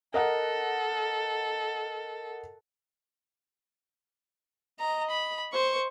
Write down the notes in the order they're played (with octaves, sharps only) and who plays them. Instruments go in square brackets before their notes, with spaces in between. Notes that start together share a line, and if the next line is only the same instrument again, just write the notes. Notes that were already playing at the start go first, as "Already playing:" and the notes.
[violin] A4 [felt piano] A#4 D#5 F#5
[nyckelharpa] D#5 [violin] A#5
[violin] B5
[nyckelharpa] C5 [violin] C#6